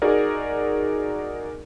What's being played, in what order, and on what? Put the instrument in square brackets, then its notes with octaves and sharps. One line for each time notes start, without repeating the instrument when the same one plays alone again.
[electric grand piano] D#4 F#4 G#4 A#4 D5